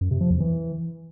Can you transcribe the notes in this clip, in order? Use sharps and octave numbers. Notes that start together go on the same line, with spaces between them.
F#2
C3
F3
E2
E3